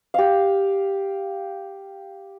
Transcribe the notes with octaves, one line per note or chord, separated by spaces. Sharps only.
G4 F5